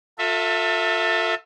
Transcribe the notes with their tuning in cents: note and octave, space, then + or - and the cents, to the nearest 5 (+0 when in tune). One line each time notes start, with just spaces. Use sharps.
F4 +35 A4 +25 E5 +0